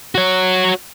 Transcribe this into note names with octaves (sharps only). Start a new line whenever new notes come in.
F#4 C#5